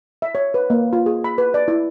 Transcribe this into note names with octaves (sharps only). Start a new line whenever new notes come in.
E5
C#5
B4
A#3
F4
G#4
B5
B4
D5
E4